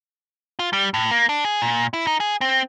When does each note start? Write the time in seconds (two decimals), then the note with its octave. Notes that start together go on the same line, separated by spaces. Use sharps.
0.59 F4
0.73 G3
0.94 A2
1.11 A#3
1.29 D4
1.45 G#4
1.62 A#2
1.94 E4
2.07 D#4
2.20 G#4
2.41 C4